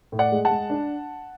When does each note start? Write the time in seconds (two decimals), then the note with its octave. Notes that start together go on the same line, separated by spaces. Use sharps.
0.12 A2
0.19 D5 F#5
0.32 G#3
0.45 F#5 A5
0.50 G#3
0.70 D4